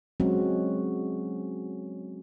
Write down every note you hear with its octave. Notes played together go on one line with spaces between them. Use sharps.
F#3 G#3 C4 C#4 F#4